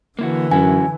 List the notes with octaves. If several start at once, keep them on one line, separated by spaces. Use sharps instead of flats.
D3 E3 A#3 E4 F#4
F#2 C#4 E4 F#4 G#5